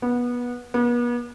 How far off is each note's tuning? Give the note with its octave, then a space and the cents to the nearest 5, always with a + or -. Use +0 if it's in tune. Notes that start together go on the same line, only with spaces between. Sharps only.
B3 -20
B3 -40